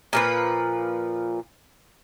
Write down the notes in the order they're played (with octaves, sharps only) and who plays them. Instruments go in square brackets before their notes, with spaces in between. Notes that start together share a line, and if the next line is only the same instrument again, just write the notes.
[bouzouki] A#2 F3 B4